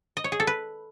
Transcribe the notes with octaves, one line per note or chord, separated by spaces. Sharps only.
D#5
C#5
G#4
A4
B4